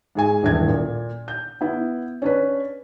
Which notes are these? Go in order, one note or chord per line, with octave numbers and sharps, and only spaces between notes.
G#2 G#4 G#5
D#1 A#1 G2 E3 G#6
A#2
G6
B3 E4
C#4 D4 B4